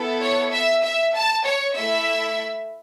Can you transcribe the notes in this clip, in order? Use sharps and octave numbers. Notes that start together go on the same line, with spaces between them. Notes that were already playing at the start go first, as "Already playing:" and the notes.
Already playing: B3 E4 A4
C#5
E5
E5
A5
C#5
A3 E4 A4 E5